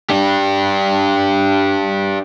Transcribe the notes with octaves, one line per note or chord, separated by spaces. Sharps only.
D4 G4